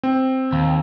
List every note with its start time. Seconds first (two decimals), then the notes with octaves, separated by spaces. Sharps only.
0.03 C4
0.53 D#2